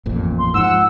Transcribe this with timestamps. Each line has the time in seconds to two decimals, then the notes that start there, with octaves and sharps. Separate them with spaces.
0.06 A1 F2 A#2
0.38 C6
0.54 G#2 F3 F#5 E6